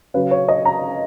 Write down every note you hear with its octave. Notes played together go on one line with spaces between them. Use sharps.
C#3 F#3 B4
C#5
D#5
A#5